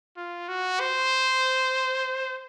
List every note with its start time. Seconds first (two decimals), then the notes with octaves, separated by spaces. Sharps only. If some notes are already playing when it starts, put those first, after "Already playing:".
0.16 F4
0.48 F#4
0.80 C5